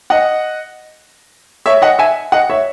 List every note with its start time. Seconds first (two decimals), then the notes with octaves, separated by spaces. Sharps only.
0.10 D#5 F#5
1.66 C#5 E5
1.82 D#5 F#5
1.99 E5 G#5
2.32 D#5 F#5
2.50 C#5 E5